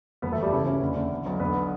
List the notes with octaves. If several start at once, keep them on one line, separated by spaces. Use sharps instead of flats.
G1 B3 B4
A3 A4
G1
G3 G4
C#3 E3 E4
E3 C#4
D3 D4
D3
B2
B1
D3 B3 B4